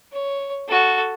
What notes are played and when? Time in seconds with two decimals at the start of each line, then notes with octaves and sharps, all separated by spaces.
0.12 C#5
0.68 F#4 A4